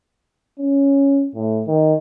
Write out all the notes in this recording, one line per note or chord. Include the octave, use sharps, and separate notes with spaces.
C#4
A2
D#3